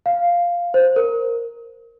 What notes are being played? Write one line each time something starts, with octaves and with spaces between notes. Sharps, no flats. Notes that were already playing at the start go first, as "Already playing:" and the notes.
F5
C5
A#4